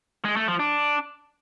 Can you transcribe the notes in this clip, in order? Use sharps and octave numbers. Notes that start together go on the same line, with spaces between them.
G#3
A3
F3
D4